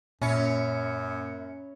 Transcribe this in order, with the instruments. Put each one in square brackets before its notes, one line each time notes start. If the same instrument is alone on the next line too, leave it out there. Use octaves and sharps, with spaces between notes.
[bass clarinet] F#2 [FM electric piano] A#2 C#7 [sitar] C#4 [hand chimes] E5 B5